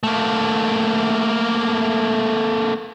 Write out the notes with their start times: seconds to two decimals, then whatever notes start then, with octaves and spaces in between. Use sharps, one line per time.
0.03 A3 A#3